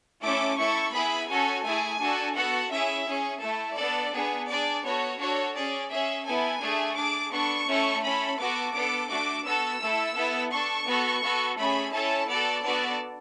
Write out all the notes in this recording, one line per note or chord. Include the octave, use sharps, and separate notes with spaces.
A3 C#4 E4 A4 D6
A3 E4 A4 C#6
B3 E4 G#4 B5
C#4 F#4 A4 G#5
A3 E4 G#4 G#5
D4 F#4 A4
B3 F#4 A4 F#5
C#4 E4 G#4 E5
C#4 G#4
A3 E4 A4
B3 D4 A4 D5
B3 D4 G#4
D4 G#4 D5
B3 F#4 A4 C#5
D4 F#4 A4 C#5
C#4 G#4 D5
C#4 G#4 E5
B3 E4 A4 G#5
A3 D4 G#4
D4 G#4 D6
B3 D4 A4 C#6
A3 C#4 E4 A4
C#4 E4 A4 B5
B3 F#4 A4 D6
B3 D4 A4 D6
A3 D4 F#4 D6
B3 F#4 A4 E6
A3 E4 A4
B3 E4 A4
D4 A4 C#6
B3 F#4 A4
B3 F#4 A4
A3 C#4 G#4 B5
C#4 E4 A4 A5
B3 F#4 A4 D5
B3 D4 F#4 A4 D5